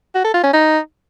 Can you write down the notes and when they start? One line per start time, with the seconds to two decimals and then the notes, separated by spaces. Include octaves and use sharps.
0.15 F#4
0.24 A4
0.34 F4
0.44 C#4
0.53 D#4